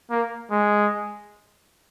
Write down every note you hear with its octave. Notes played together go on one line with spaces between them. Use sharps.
A#3
G#3